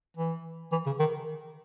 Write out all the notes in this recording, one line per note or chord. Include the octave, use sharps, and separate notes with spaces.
E3
E3
C#3
D#3